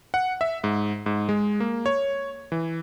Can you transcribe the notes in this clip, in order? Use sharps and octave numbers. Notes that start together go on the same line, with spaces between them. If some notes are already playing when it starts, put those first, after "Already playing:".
F#5
E5
G#2
G#2
G#3
A#3
C#5
E3